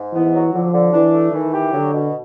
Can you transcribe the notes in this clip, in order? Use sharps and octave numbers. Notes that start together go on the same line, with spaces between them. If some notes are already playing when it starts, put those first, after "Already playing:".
Already playing: G#2
E3 B3
F#3
D3 F3
D3
E3 D4
A3
D#3 E3
G4
D3 F#3
B2